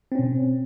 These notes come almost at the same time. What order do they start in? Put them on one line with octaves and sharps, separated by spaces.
C4 C#4 B2